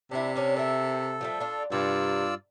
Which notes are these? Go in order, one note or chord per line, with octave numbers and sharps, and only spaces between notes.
C3 D4 E4
C#4 D4 C#5
A4 A#4 E5
F3 G3 A3
D4 F4
G2 C3 F4 D5 E6